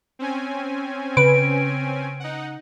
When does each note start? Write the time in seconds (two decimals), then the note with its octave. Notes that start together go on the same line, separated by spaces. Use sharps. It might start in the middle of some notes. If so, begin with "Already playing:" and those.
0.19 C4 C#4 G#5
1.17 C#3 B4 D7
2.20 D#4 F#5